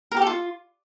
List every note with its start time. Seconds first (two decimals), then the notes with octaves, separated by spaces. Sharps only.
0.12 A#4
0.17 G4
0.22 A4
0.27 F4